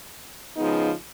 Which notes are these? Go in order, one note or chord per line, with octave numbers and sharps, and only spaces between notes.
C#3 F3 G#3 B3 D#4